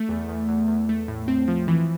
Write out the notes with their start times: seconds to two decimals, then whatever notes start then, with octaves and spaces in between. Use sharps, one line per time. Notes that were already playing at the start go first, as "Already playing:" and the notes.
Already playing: A3
0.09 E2
0.29 E2
0.49 E2
0.68 E2
0.89 A3
1.08 A2
1.28 C4
1.48 F3
1.68 E3